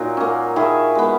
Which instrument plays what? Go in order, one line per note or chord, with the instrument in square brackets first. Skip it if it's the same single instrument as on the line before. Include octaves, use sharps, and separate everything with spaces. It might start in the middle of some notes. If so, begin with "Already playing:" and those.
Already playing: [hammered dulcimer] A#2 F#3 D#4 F#4
A#3 C#4
D#3 E4 G#4
G#3 B3